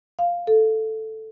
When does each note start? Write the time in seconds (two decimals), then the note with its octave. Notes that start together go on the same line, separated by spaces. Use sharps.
0.19 F5
0.47 A4